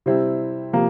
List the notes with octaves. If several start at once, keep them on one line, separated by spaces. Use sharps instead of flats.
C3 G3 C4 E4
C3 F3 A#3